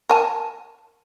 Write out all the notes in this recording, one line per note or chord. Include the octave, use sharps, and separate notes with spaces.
A#4 G#5 A5